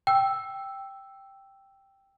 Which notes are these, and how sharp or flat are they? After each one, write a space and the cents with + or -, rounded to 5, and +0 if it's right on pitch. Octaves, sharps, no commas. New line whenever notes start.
G5 +0 E6 +0